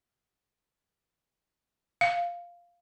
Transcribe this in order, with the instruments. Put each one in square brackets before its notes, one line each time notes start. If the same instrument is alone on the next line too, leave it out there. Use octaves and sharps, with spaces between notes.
[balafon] F5